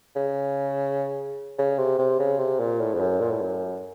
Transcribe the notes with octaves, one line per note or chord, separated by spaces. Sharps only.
C#3
C#3
C3
C3
C#3
C3
A#2
A2
F2
F#2
A#2
A2
F#2